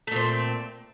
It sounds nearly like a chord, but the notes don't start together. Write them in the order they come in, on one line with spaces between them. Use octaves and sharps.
A3 A#2 C4